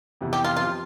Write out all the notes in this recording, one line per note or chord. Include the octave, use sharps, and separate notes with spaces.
F2 C3 E3 B3
G4
F4
F3 C4 F4 G4